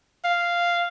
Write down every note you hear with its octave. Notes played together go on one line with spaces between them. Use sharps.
F5